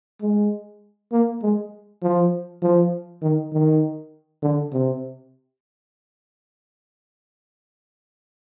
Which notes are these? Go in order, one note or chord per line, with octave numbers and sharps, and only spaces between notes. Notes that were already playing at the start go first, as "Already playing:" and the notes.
G#3
A#3
G#3
F3
F3
D#3
D#3
D3
C3